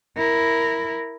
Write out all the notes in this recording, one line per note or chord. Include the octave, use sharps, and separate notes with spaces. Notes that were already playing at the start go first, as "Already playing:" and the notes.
E4 A#4